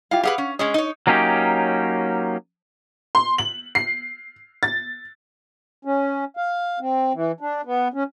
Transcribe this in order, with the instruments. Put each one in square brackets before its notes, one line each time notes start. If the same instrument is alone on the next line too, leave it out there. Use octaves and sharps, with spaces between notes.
[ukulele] E4 F4 G4 [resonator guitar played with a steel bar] F5
[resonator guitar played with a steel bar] G4 G#4 B4 [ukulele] F5 F#5
[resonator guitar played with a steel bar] C#4
[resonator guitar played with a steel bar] G#3 C#4 G#4 [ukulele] D#5
[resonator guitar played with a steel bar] D#4 C#5
[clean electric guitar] F#3 A#3 C#4 D#4 G4
[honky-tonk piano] C6
F#7
C7
A6
[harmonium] C#4
F5
C4
E3
D4
B3
C#4